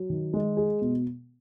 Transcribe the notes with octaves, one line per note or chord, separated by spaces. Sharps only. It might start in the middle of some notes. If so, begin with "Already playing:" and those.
Already playing: F#3
D#3
G#3
G#4
B2